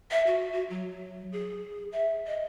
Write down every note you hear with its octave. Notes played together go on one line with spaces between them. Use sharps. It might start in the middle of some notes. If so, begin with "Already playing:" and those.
E5
F#4
F#4
F#3
G#4
E5
D#5